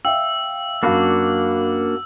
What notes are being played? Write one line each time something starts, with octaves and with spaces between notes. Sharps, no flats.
E5 F5 G5 E6
F#2 A#3 D4 F#4 F5 B5